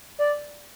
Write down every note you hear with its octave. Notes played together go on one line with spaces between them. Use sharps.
D5